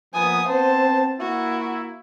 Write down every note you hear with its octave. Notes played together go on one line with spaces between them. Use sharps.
F3 A#3 B3 G#5 D#6
B3 C4 C5 A5
A#3 E4 F#4